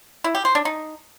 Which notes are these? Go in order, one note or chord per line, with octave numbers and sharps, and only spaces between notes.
E4
G4
C5
D4
D#4